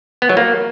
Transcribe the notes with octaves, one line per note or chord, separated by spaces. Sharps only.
B3
F#3
A#3